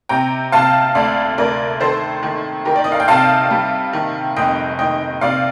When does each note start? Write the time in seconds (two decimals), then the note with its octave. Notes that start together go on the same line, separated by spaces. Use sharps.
0.09 C3 G5 A#5
0.52 C3 F5 A5
0.95 D2 D5 F5
1.38 D2 A#4 D5
1.80 D#3 A4 C5
2.23 D#3
2.65 D#3 G4 A#4
2.76 D5
2.84 D#5
2.92 F5
3.00 G5
3.08 C3 F5 A5
3.51 G3
3.93 D#3
4.36 F1 D#5 G5
4.79 D#3 D#5 G5
5.21 C3 D5 F5